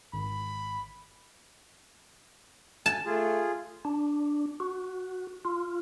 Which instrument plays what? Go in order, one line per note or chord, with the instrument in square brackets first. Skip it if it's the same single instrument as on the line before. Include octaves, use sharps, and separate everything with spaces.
[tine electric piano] G#1 [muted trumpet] B5
[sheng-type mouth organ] G#5 [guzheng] A5
[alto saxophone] A3 [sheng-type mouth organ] F4 G#4
[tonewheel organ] D4
F#4
F4